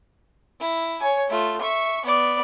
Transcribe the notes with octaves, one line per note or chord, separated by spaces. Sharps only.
E4
C#5 G#5
A3 F4
E5 C#6
B3 D5